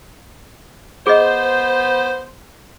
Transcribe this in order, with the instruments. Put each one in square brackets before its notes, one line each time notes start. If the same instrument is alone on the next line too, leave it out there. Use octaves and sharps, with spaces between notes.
[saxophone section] B3 C5 [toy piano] G#4 D#5